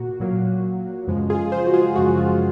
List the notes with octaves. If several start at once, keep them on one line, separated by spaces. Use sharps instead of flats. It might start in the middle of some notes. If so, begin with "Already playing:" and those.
Already playing: A#2 A#3 F#4
A#2 F#3 A#3
F#2 C#3 F3 G#3
F4 G#4
G#4 C5
F#4
F4 G#4
F#2 C#3 F3 G#3 F#4
F4